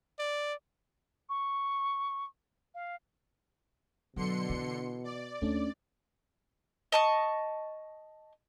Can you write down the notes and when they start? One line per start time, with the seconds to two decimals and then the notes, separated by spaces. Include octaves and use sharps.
0.19 D5
1.29 C#6
2.74 F5
4.16 B2 D3 F#3 C6 C#7
4.50 E3 E4
5.04 D5
5.42 D#2 A3 C#4 D4
6.92 D#5 A5 C#6